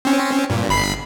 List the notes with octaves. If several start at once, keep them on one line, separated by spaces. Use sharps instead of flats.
C4 C#4
G2 A#2
G1 B5 C7